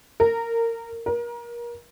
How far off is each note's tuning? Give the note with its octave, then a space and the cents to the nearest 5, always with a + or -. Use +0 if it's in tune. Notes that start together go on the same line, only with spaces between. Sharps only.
A#4 -20
A#4 +30